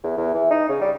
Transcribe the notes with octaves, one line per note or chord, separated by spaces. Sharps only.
E2
E2
E3
D#4
C#3
G3